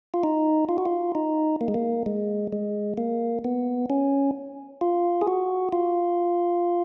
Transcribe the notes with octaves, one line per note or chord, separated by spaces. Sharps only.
F4
D#4
F4
F#4
F4
D#4
A#3
G#3
A#3
G#3
G#3
A#3
B3
C#4
F4
G#4
F#4
F4